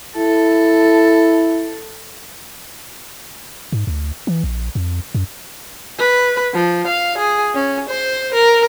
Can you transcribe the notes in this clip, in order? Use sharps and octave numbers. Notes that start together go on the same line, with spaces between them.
E4 A4
G#2
D2
E3
A#1
F2
F#2
B4
F3
F5
G#4
C#4
C5
A#4